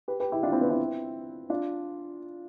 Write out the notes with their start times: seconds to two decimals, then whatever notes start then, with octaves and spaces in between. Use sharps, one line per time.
0.08 G4 B4
0.20 G4 B4
0.32 E4 G4
0.43 D4 F4
0.52 C4 E4
0.61 B3 D4
0.70 C4 E4
1.50 D4 F4